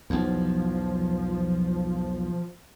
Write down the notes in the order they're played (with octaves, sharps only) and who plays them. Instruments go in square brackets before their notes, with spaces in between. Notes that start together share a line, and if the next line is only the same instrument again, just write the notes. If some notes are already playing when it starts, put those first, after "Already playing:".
[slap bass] B1 E2 [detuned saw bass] F3